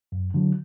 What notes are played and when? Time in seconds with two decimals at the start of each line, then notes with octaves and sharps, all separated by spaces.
0.12 F#2
0.34 D3 F#3